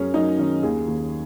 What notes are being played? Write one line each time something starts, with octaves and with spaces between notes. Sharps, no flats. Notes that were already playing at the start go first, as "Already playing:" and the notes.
Already playing: F#2 F#3 C#4 G#4 A#4
F#3 D#4
D#3 C#4
D#2 G#4
D#2